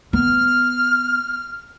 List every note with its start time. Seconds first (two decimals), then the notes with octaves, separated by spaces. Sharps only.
0.13 B3 F6